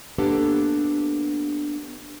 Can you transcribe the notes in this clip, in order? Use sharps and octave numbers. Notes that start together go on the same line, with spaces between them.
A#3 B3 D4 G4 A4